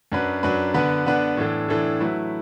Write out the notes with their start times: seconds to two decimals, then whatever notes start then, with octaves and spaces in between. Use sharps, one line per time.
0.12 F#2 F#3 D4 B4
0.43 F#2 F#3 D4 B4
0.74 D3 B3 D4 B4
1.06 D3 B3 D4 B4
1.37 A2 E3 D4 A4
1.68 A2 E3 D4 A4
2.00 F#3 A3 E4 B4